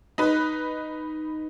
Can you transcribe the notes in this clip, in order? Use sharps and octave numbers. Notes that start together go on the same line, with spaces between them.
D#4 B4